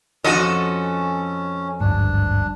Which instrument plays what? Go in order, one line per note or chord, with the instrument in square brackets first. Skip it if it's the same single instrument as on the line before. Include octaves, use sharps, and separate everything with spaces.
[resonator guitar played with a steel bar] F2 F#4 [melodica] C#4 [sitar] A4 D#5
[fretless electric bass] G#1 D2 G2 [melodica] D4